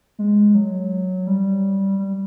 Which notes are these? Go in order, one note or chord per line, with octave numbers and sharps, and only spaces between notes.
G#3
F#3
G3
G3